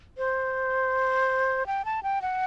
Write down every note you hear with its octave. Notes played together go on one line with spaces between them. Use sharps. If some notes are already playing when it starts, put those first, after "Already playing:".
C5
G5
A5
G5
F#5